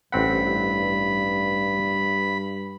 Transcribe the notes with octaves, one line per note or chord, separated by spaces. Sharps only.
A1 G2 C4 F#5 B5